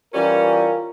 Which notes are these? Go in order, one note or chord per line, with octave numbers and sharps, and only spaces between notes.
E3 G3 C#4 F4 A#4